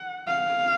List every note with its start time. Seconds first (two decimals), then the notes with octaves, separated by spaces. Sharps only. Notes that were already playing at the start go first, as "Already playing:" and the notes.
Already playing: F#5
0.28 F5